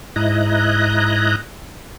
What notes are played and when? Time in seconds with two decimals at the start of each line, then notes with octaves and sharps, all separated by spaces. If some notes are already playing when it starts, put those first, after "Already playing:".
0.16 G#2 E4 D#5 A#5 F#6